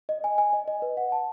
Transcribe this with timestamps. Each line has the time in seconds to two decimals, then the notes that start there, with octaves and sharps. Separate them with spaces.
0.09 D#5
0.24 G#5
0.38 G#5
0.53 D#5
0.68 D#5
0.82 B4
0.97 F#5
1.12 A5